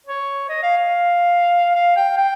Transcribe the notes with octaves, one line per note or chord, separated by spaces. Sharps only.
C#5
D#5
F5
F5
F5
G5
G5